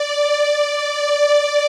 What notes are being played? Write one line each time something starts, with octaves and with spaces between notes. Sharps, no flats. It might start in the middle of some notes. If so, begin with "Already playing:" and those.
Already playing: D5
D5